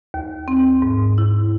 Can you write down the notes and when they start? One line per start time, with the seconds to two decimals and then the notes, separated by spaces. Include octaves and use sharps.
0.14 D#2
0.48 C4
0.82 G#2
1.18 E4